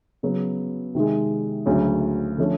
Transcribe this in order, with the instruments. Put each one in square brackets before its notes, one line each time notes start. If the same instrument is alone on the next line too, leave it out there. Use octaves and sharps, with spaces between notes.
[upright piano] C#3 F#3 B3
C3 D#3 G#3
D2 C#3 F#3
D3 F3 A3 C#4